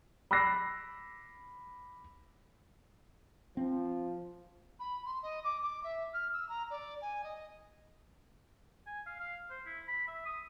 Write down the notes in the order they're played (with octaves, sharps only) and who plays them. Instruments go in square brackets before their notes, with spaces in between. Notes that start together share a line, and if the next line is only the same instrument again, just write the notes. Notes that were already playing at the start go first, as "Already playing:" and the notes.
[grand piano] B5 D6 E6 F#6 A#6 C7
[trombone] F3 [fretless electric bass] C4
[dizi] B5
C6
D#5
D6
D6
E5
F6
E6
A#5
D5
G#5
D#5
[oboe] G#5
F5
F5
C5
E4
B5
E5
D#6